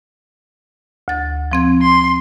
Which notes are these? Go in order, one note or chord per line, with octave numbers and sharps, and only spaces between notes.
D2 A6
F3 C4 G#6
C6